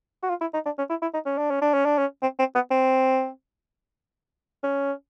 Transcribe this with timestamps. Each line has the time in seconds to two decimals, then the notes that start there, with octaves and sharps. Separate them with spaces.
0.23 F#4
0.29 F4
0.41 E4
0.54 D#4
0.66 D4
0.78 C#4
0.90 E4
1.02 E4
1.14 D#4
1.26 C#4
1.38 D4
1.51 C#4
1.62 D4
1.74 C#4
1.86 D4
1.98 C#4
2.23 C4
2.39 C4
2.55 B3
2.71 C4
4.63 C#4